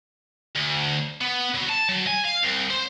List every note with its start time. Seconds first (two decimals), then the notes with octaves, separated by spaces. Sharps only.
0.55 D2
1.21 B3
1.55 F#3
1.70 A5
1.89 F#3
2.07 G#5
2.25 F5
2.43 C2
2.70 C5